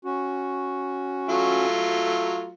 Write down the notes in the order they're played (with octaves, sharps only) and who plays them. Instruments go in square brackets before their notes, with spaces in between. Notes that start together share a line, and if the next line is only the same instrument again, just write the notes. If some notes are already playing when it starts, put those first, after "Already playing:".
[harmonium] C#4 F#4
[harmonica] F#3 A3 F4